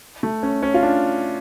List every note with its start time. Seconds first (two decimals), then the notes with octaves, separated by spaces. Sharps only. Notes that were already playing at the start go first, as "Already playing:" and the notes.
0.23 A3
0.43 C#4
0.63 C#4
0.74 F4
0.83 D4